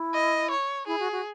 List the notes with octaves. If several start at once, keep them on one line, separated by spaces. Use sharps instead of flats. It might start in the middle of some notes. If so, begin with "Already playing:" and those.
Already playing: E4
D#5
C#5
E4 G#4
F#4
F#4